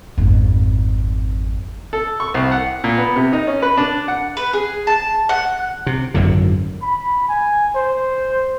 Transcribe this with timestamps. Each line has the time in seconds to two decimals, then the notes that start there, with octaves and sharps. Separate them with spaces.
0.18 G#1 F2
1.93 A4
2.20 C#6
2.34 C2
2.52 F#5
2.84 A#2
2.98 B3
3.16 C3
3.33 D#4
3.47 C#4
3.62 B4
3.78 D4
4.08 F#5
4.37 B4
4.53 G#4
4.87 A5
5.29 F#5
5.86 C3
6.14 G#1 F#2 A2 D3
6.82 B5
7.29 G#5
7.76 C5